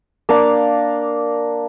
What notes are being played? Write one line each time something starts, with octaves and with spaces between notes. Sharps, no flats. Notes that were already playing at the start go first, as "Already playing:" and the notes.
A#3 D4 F5